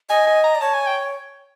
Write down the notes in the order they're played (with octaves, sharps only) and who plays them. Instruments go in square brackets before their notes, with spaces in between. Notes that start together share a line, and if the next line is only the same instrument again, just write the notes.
[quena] D#5 [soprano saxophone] G#5
[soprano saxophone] G#5
A#5
[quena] D5
[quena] C#5 [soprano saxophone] A5
[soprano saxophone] G#5
G5